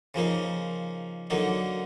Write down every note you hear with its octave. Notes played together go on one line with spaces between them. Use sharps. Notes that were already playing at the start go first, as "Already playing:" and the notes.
C#3 F3 A#3 D#4
D3 F#3 A#3 D#4